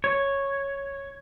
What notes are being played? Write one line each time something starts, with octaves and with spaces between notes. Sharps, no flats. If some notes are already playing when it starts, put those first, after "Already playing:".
C#5